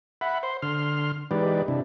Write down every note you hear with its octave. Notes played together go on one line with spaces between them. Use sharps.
E5 F#5 B5
C5 C6
D3 C6 F6
E3 G#3 D#4 G4 B4 D5
C3 D4 E4